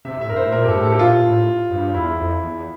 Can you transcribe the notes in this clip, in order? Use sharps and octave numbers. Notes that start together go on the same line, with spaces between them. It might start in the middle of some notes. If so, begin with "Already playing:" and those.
C3 E5
A2 E5
G2 A#4
A2 C5
A#2 A#4
G2 G4 A4
A2
A4
G4
A#2 F4
A2
G2
E2 E4
F2
E2